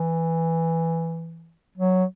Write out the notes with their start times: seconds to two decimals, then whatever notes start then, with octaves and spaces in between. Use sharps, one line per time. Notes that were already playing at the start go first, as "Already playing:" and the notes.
Already playing: E3
1.78 F#3